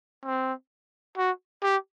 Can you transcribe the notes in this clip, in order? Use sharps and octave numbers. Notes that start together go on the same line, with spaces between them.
C4
F#4
G4